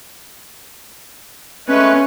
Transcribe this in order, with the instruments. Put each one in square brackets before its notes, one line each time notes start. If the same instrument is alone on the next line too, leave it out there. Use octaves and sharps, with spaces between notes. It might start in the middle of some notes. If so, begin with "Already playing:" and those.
[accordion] G#3 A3 B4 [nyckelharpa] C#4